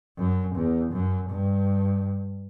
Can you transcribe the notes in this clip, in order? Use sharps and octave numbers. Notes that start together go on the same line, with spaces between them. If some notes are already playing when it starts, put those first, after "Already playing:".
F#2
E2
F#2
G2